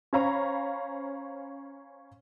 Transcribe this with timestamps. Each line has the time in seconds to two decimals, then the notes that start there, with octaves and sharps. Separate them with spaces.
0.13 C#4 C5 C#5 F5 A#5 B5